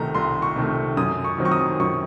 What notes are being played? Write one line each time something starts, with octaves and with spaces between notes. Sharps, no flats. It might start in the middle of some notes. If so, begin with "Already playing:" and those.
Already playing: C2 C3 D#3 A3 A#5
C2 C6
C#6
C3 D#3 A3
F#2 D#6
C#6
D#3 F#3 C4
C#6
D#6
F#2 C#6